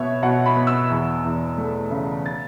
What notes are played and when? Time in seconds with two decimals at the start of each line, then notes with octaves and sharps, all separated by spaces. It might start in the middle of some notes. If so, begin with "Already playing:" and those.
Already playing: B2 B3 C#5 E5
0.23 B2 F#5
0.46 B5
0.56 B3
0.67 E6
0.90 E2
1.24 E2
1.58 A3
1.91 C#3
2.26 A6